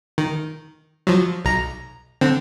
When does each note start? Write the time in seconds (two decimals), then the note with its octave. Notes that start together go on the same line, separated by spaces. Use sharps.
0.18 D#3
1.07 F3 F#3
1.45 B1 A#5
2.21 D3 C4